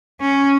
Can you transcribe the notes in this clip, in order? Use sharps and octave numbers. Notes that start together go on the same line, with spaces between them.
C#4